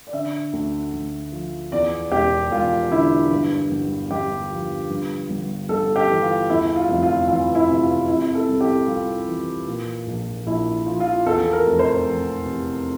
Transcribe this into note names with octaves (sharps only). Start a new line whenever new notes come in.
D5
D3 E5
D2
D2
F3
E2 D5
E1 G4
E1 F4
D3 E4
G2
G1
G1 G4
F3
G2
G1
G1 A4
G4
E3
F4
E2 E4
F4
F1
F4
E3 F4
E4
C3
F4
C3 E4
A4
C2
G4
C2 F4
E3
A#2
A#1
A#1 E4
F3
F4
E2 A4
A#4
F1
C5
F1
C3